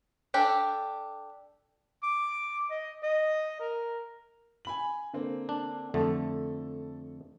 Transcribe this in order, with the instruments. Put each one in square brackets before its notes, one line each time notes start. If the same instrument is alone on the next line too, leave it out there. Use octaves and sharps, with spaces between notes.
[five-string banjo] D4 G4 A4
[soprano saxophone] D6
D#5
D#5
A#4
[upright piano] G#5 B5 F#7
D3 A#3 C4
[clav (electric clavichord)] D4
[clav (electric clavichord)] F2 D3 A3 [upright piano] A4